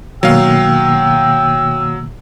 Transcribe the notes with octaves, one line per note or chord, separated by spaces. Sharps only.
B2 D#3 F#3 A#3 F5 G5 E6